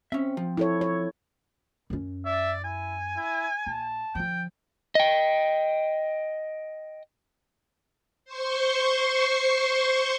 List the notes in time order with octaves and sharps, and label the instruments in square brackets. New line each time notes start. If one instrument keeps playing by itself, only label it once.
[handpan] C4 [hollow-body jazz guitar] C#4 E5
[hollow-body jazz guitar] F3
[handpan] E4 A4 C#5
C#5
[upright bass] F#2 C#4
[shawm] D5 [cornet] E5
[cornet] E4 [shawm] G#5
[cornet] E4
[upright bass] A#1 [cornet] A5
[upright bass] D3 F3 [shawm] G5
[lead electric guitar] D#5 G5
[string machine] C5 C6 C#6